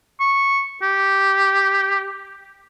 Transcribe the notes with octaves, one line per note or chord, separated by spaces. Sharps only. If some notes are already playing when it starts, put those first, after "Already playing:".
C#6
G4